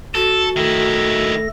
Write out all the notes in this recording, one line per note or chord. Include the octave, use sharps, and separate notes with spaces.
F#4 A4
D#3 A3 E4 A4 A#6